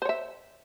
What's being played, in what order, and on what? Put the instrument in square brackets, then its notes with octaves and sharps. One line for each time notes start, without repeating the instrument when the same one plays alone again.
[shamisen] C5
C#5
E5